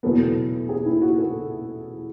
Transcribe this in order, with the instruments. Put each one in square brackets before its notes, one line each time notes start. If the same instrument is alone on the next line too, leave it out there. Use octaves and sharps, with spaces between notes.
[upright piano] E2 B2 F#3 B3 A4
G#4
E4
F#4
A4